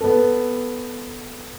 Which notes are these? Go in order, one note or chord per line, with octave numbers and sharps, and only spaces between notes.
B3 A4